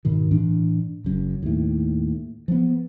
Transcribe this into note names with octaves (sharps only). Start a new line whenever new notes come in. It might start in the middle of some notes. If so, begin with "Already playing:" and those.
G#2 B2 D#3
A2 E3 D4
F#1 F#2
D#2 A2
F3 B3